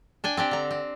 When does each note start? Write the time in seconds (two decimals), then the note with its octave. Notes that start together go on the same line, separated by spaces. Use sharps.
0.24 D4 G5 G#5
0.37 C4 D4 G4
0.51 D3 A#5
0.71 C4